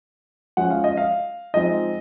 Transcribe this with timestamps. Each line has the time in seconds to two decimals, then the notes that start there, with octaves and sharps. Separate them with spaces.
0.57 F3 G#3 C#4 F4 F#5
0.70 F5
0.84 D#5
0.97 F5
1.54 F3 G#3 C4 D#4 D#5